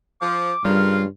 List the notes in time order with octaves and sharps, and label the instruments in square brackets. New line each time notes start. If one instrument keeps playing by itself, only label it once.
[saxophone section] F3 [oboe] D6
[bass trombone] G2 [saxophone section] C#3 F4 [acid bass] G3 [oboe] A#4